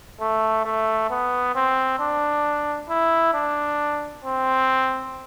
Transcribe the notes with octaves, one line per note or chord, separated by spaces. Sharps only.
A3
A3
B3
C4
D4
E4
D4
C4